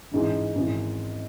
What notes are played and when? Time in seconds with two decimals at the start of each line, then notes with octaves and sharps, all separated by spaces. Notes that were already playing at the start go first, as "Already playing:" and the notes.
0.11 A1 G#2 E3
0.55 G#1 G#2 E3